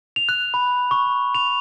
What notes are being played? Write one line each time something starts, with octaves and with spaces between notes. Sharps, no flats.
F7
F#6
B5
C#6
F7